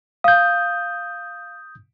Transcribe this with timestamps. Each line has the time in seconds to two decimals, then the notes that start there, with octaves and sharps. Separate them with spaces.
0.24 F5 D#6 G6